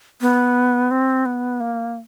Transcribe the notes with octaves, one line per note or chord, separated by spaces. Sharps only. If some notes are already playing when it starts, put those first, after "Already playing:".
B3
C4
B3
A#3